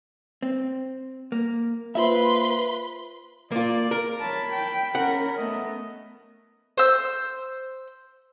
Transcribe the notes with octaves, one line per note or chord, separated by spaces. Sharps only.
C4
A#3
A#3 F4 B4 C5 E5 B5 C6
A#3 F4 D5
A#4
C#5 A5 B5
G5
C#4 A#4 F#5
A3 B3 D#5
C5 E6